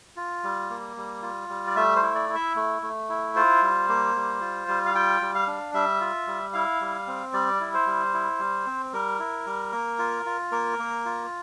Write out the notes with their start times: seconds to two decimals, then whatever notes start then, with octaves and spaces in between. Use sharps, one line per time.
0.16 F4
0.43 G3
0.70 A#3
0.97 G3
1.22 F4
1.49 G3
1.67 D5
1.76 A3 E5
1.96 C5
2.02 E4
2.15 D5
2.29 E4
2.35 E5
2.56 A3
2.82 A3
3.09 E4
3.36 F4 C5
3.62 G3
3.89 A#3
4.15 G3
4.41 F4
4.68 G3
4.86 F5
4.95 F4 G5
5.21 G3
5.35 F5
5.47 D4
5.74 G3 E5
6.01 F4
6.27 G3
6.53 E4 F5
6.81 G3
7.07 C4
7.33 G3 D5
7.61 E4
7.74 C5
7.87 G3
8.14 E4
8.39 G3
8.66 C4
8.93 G3 A#4
9.19 E4
9.46 G3
9.72 A#3
9.99 F4
10.26 F4
10.52 A#3 A#4
10.79 A#3
11.05 F4